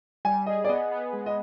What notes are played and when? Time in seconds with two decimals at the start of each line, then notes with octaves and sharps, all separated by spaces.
0.25 G3 G#5
0.46 G#4 D#5
0.64 D5
0.69 B3 D#5
0.91 B3
1.13 G#3
1.26 D#5